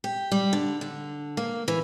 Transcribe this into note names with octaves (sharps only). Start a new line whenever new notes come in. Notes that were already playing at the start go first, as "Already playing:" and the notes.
G4
G3
D3
D3
A#3
E3